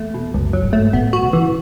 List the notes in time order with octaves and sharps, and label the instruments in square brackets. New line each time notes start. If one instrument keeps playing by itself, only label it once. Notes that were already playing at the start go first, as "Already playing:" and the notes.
Already playing: [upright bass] E2 [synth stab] A3
[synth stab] B2
[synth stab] C#2 [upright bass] F#2
[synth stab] F#3
[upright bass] G#2
[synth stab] A3
[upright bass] A2 [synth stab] B3
[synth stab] F#4
[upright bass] C#3
[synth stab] E3